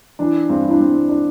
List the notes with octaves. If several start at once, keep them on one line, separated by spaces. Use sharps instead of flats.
E3 D4
G2 C4
E4
D4
G2 C4
C4
D4